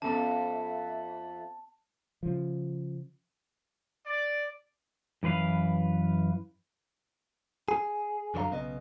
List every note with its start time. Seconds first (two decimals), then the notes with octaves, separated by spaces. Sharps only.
0.02 F2 B3 C#4 A4 E5 A5
2.23 C#3 F3
4.06 D5
5.23 F#2 E3 B4 F5
7.69 G#4
8.34 F#2 D3 F#3 C#5 F5 A#5
8.49 B1 C#3 B3 D#5